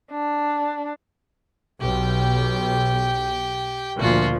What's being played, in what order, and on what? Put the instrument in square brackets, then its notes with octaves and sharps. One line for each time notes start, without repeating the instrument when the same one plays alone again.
[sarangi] D4
[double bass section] B1 [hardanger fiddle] G4 G5
[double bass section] D2 A#2 F3 [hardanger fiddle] F4 F#4